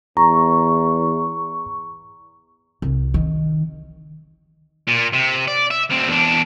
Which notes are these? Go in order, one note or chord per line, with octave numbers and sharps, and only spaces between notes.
E2 A#5 C#6
C2
D#3
A#2
C3
D5
E5
D2 C4
E2 D4